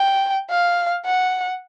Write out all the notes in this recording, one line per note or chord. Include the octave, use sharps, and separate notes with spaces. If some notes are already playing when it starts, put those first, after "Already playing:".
Already playing: G5
F5
F#5